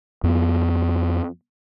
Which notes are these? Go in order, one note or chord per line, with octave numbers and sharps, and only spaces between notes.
F2 B3